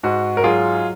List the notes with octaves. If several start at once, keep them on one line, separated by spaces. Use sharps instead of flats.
G#2 F#4
A#4
F#3 F4 G#4